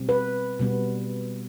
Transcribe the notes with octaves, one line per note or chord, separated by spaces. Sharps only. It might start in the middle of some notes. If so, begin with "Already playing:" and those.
Already playing: B2 G3 C4
B4
B2 G3 B3